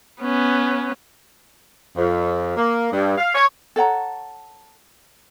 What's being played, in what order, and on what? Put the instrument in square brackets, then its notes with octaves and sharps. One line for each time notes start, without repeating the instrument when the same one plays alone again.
[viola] B3 C#4
[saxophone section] F2
A#3
G2
F5
C#5
[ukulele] A4 C#5 F#5 A#5